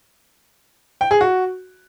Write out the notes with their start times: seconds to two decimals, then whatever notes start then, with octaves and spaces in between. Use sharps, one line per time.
1.01 G5
1.11 G#4
1.21 F#4